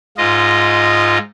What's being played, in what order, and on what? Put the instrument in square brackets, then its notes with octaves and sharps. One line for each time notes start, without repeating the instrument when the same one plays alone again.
[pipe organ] G#2 F4 D#5